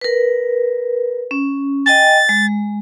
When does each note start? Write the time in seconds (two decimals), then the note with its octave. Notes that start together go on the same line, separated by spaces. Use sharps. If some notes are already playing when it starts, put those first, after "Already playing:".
0.01 A#4 B4
1.31 C#4
1.86 D#5 G5 G#5 A6
2.29 G#3